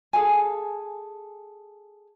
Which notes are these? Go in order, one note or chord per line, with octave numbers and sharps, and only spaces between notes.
G#4 A4 F5 G#5